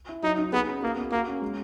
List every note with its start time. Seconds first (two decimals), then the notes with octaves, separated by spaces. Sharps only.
0.09 E4
0.23 F#3 D#4
0.38 D#4
0.52 B3 G#4
0.68 C#4
0.82 A#3 F#4
0.97 B3
1.12 A#3 F#4
1.28 C#4
1.42 G#3